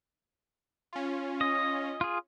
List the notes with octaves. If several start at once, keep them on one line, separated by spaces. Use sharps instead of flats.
C#4 F4
D#5
F4 G#4